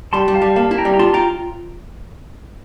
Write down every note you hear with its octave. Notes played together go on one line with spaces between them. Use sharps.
G3 A5 C6
G3
F5 A5
G3
A#3 F5 A5
E4 A5
G5 A#5
G3
A#5
F4 A5 C6
F4 G5 A#5